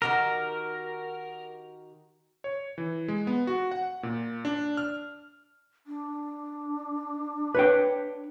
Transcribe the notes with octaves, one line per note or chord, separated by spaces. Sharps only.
D#3 F#4 G4 A#4
C#5
E3
G#3
B3
F#4
F#5
A#2
D4
F6
D4
B4 C#5 G5